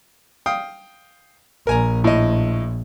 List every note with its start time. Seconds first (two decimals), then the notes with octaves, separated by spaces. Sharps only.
0.46 F5 G5 D#6
1.67 A#1 A#4 G#5 A#5
2.04 A2 D#5